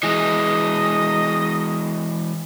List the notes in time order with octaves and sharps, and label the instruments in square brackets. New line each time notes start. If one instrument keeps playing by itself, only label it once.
[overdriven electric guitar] E3 G#3 [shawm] D#5